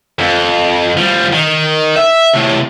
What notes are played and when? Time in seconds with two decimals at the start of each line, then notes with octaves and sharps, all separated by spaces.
0.19 F2
0.97 F3 G3
1.33 D#3
1.96 E5
2.34 A2 C3